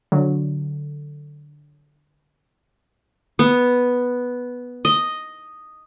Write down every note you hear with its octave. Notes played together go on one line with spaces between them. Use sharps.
D3 F#3
B3
D#5